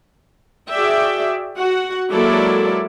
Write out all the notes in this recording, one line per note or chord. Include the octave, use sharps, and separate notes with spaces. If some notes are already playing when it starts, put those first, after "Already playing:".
F#4 G#4 D5 E5 G5
F#4 F#5
F#3 G#3 A#3 E4 A4 D5